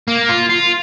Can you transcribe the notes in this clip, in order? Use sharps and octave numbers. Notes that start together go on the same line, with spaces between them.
A#3
F4
F4